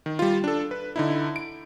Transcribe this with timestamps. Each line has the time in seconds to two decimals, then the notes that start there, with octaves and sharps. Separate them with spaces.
0.06 D#3
0.19 G3 F4
0.44 D4 A4
0.71 B4
0.96 D3 D#4 E4
1.36 D7